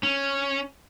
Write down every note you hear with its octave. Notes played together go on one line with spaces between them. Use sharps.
C#4